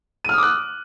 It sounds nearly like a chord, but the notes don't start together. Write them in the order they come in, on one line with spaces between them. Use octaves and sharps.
D#7 F6 D#6 D6 F#6